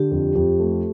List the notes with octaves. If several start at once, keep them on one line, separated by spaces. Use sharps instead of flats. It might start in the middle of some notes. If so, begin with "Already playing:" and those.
Already playing: D3 G4
F2
F2
A3